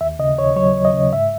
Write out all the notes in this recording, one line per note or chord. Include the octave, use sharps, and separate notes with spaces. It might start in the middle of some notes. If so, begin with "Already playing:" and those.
D#2 E5
C#3 D#5
D#2 C#5
F#3 C#5
D#2
D#5
C#3
G#2 E5